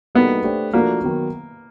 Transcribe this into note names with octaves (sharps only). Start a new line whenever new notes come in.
G3 A#3 B3 D#4 F#4 A4
A3 D4 G4 C5
F3 A3 A#3 D4 F#4
D#3 F#3 B3